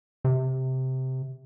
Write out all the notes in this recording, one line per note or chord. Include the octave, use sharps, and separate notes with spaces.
C3